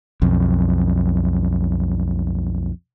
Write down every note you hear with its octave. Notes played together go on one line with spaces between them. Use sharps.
B1 F2